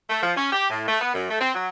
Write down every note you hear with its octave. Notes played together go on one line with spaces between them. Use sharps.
A3
F3
C#4
G4
A2
A3
B3
F#2
A3
C4
F#3